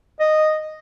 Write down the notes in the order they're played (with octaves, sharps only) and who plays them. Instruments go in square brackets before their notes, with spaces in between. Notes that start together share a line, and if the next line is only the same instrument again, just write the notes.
[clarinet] D#5